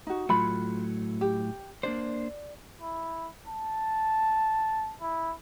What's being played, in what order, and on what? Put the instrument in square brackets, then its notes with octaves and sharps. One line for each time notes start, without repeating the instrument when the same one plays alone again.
[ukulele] D#4 F#4
[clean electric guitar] A2 F#3 A3 [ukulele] F4 B5
[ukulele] G4
[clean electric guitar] A#3 D4 C5 [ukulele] D5
[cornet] E4
A5
E4